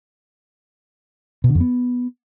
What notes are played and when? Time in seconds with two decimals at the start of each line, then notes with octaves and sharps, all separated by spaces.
1.44 B2
1.49 D3
1.55 F2
1.60 B3